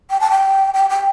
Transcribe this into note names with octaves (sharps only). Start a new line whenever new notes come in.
G5
A5
G5
G5
G5